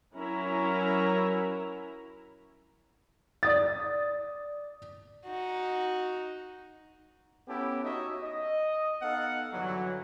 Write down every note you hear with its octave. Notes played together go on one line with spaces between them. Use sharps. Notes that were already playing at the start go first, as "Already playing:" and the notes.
F#3 C#4 E4 A#4 A#5
D5 D#6 A6
D#4 F#4
B3 C#4 E4 G4 A4 A5
D#4 F#4 C#5 D#5 E5
D#5
B3 D#4 A4 F5 F#5
G2 D3 E3 F#3